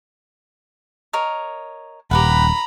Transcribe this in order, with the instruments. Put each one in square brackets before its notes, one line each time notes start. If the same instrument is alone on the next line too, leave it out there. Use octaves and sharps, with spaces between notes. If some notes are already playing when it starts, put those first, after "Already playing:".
[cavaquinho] A#4 C#5 D#5
[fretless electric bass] D#1 [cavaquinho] G4 B4 F#5 [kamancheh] A#5 B5